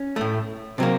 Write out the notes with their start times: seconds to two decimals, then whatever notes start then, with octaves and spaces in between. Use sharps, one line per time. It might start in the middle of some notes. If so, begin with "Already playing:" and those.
Already playing: C#4
0.16 A2 A3
0.78 C3 F#3 A#3 C4